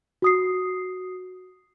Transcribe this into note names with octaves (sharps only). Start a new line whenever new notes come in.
F#4 D#6 C7